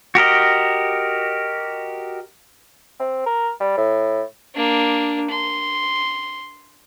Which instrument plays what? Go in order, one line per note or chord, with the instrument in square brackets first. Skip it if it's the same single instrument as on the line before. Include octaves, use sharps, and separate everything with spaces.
[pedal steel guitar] F#4 G4 A#4 D#5
[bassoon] C4
A#4
G3
A2
[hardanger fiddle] A#3 D4
C6